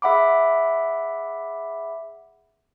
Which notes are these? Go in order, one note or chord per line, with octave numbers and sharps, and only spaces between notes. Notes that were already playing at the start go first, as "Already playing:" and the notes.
G#4 E5 F#5 B5 D6